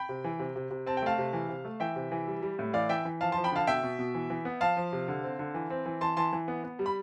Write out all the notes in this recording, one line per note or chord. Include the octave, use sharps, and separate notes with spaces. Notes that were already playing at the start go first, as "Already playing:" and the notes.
Already playing: G5 B5
C3
E3
C3
C3
C3
C4 A5
G5
A3 F5 A5
C3
E3
C3
A3
E3 E5 G5
C3
E3
G3
G3
A2
E3 D5 F5
E3 E5 G5
E3
F3 F5 A5
F3 A5 C6
G5 B5
D3 F5 A5
B2 E5 G5
B2
B2
E3
E3
B3
F3 F5 A5
F3
C3
D3
C4
D3
E3
C4
E3
E3 A5 C6
E3 A5 C6
E3
B3
B3
G3
B5